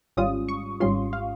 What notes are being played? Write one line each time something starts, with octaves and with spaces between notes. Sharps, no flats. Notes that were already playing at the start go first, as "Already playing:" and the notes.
G#1 G#2 G3 C#4 F4 D#6
C#6
G#1 G#2 G3 C#4 F4 C6
F5